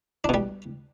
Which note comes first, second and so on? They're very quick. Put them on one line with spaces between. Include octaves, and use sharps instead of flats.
D4 B2 G3